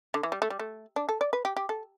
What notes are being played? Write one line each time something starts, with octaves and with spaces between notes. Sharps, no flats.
D3
E3
G3
A3
G3
A3
D4
A4
D5
B4
G4
G4
A4